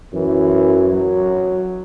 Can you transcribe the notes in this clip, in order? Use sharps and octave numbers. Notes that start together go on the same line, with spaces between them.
F#2 E3
F#3